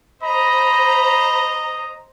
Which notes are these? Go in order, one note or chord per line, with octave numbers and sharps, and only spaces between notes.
C5 D#5 A#5 B5